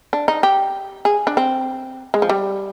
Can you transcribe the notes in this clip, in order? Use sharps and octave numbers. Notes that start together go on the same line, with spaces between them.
D4
D#4
G4
G#4
D4
C4
G#3
F3
G3